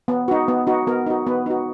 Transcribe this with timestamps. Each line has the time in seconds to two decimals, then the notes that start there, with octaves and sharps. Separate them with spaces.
0.08 B3
0.28 D#4 F#4
0.48 B3
0.67 D#4 F#4
0.87 B3 A#4
1.06 D#4 F#4
1.27 B3 B4
1.46 D#4 F#4